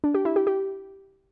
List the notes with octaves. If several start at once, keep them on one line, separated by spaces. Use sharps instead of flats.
D4
G4
E4
G4
G4